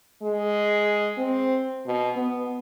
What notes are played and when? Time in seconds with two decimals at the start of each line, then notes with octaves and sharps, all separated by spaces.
0.22 G#3
1.18 C4
1.86 B2
2.16 B3